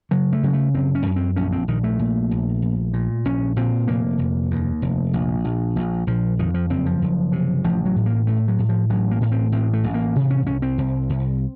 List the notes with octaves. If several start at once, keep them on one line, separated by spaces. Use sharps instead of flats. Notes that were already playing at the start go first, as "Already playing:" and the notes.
C#3 F#3
A3
C#3 F#3
A3
F#1 C4
C#4
F#2
C4
A#1 C#4
C4
A#1 D#3
A3
A#2
A#1
A#1
A#2
A#1 C#4
A#2 C4
F1 A#3
F1
D#2
F1
A#1
A#1
A#1
A#1 F3
F2 D#3
F3
F#1 C4
F3
F#1
C3
A1 F3
F#3
A2
A#3
A2 A3
F#3
A2
F3
A1 F#3
A#3
A2 A#3
C4
A1 C4
A3
A1
A#3
C3
C#4
C2 C#4
C4
C2
C2